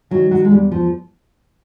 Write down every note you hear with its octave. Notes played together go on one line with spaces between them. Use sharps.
D#3 F#3
F#3
G#3
E2 G3
F3